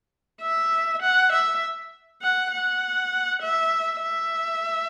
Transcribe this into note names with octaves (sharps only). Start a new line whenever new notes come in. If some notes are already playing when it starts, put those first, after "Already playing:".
E5
F#5
E5
F#5
F#5
E5
E5